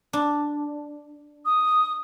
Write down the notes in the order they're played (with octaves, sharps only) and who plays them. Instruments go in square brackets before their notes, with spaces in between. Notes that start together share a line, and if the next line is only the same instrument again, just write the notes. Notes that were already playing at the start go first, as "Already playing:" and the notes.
[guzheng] D4
[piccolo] D#6